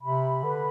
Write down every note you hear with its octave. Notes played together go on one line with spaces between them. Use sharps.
C3 B5
D3 B4